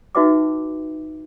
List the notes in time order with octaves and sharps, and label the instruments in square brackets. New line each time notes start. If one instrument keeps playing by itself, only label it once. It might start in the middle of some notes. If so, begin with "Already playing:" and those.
[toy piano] D#4 F#4 B4 E5 G5 D6